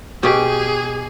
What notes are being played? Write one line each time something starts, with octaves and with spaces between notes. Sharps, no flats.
B2 G4 G#4